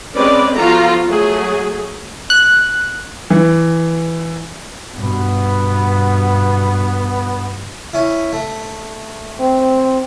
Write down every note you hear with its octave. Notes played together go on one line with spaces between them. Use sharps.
G#3 C4 C#4 B4 D5
F3 B3 F4 F#4 A4 A#5
F#3 A3 G#4
F#6
E3
G2 B2 B3
C#4 E4
A3
C4